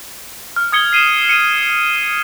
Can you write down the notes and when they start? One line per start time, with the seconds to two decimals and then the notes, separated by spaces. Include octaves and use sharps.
0.56 F6
0.72 D#6 G#6 C#7 G7
0.93 C7 D#7 E7 G7
1.29 C#7 D#7